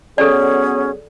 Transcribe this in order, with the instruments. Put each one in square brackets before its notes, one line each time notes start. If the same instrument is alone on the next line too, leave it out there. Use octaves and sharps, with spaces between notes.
[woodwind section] F#3 B3 G#4 [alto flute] C#4 [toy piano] A4 D5